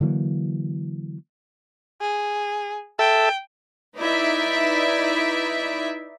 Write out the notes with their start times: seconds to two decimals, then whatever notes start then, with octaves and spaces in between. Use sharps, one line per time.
0.01 D3 E3 F#3 A#3
2.01 G#4
2.99 A4 E5 G5
3.97 D#4 E4 B4 D5 E5